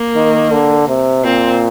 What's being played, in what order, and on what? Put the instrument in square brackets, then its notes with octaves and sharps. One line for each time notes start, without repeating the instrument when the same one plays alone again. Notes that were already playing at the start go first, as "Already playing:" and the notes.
Already playing: [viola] A#3
[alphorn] D#3
D3
C3
[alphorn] A#2 [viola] C4